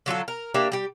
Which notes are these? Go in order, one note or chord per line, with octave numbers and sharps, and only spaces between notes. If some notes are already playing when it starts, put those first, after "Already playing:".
D3 F#3 F4 A4
A#4
A#3 D4 G4 E5
G3 G4